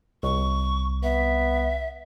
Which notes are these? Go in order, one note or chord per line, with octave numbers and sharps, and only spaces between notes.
C2 C#6
B3 E5